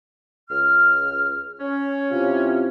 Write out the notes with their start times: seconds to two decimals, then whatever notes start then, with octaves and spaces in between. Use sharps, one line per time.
0.50 C#2 F6
1.60 C#4
2.11 C3 E4 F4